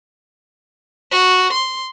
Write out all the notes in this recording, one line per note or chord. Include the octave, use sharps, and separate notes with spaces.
F#4
C6